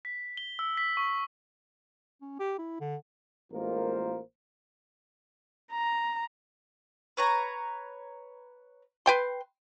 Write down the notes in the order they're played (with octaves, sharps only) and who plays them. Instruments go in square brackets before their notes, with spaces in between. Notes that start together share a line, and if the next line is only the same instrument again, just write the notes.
[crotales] B6
G7
E6
B6
C#6
[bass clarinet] C#4
G4
E4
D3
[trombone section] A1 G#3 A#3 F4 A#4 C5
[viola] A#5
[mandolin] B4 C#5 A#5
[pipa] B4 G5 C6